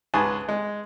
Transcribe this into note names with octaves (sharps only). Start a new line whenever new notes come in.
C#2 G#2 G#4 B4 G#5 A5
G#3